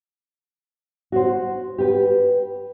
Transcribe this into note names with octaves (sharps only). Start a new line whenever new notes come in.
F#4 C5
G4 B4